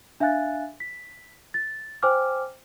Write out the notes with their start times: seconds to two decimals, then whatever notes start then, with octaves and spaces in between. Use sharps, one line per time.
0.20 D4 E5 F5 G#5 F#6 A6
0.80 B6
1.54 A6
2.03 C5 G5 G#5 D6 F6